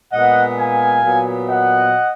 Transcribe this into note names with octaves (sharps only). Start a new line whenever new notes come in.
A#2 G#3 B3 D#5 F#5
F5 G#5
A#2 F#3 B3
D#5 F#5